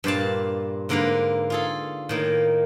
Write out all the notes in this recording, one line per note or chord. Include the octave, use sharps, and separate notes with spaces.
G2 A#2 C5 D5 F5 A5
G#2 D3 A#3 A#4 B4 A#5
F4 G#4 A4
A2 D#3 A#3